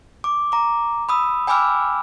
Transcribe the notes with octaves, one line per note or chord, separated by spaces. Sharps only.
D6
A#5 D6
B5 D#6 E6
G5 G#5 B5 D6 E6 F6